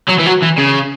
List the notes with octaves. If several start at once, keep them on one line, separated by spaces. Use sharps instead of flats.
F#3
E3
F#3
E3
C#3